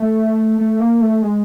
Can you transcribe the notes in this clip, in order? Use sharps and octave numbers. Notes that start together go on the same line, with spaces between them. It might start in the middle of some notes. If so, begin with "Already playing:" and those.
Already playing: A3
A3
A#3
A3
G#3